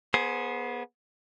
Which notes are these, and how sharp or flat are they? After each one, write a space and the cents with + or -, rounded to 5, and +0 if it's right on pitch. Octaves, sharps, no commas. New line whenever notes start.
B3 -25 G#4 +15 C5 +0